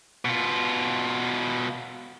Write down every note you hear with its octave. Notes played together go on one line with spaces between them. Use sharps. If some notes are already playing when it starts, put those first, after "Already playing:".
B2 F4